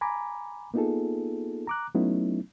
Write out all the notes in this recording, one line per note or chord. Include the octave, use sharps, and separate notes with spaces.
G#5 A#5 B5 D6
A#3 B3 D#4 F4 G#4 A4
A#5 D6 F#6
F#3 A3 B3 C#4 D#4 E4